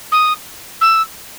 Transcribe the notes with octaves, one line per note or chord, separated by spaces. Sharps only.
D#6
E6